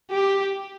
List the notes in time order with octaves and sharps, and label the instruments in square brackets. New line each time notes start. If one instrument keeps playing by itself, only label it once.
[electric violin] G4